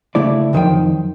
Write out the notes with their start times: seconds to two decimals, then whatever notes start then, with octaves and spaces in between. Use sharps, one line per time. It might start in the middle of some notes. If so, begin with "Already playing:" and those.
0.15 C#3 A3 E4 D5
0.53 B1 F2 D#3 F3 F#3 G5